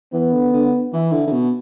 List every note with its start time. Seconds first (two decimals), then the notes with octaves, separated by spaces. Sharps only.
0.12 E3 B3
0.33 D3
0.53 D3
0.93 E3 E4
1.12 D3
1.27 D3
1.32 B2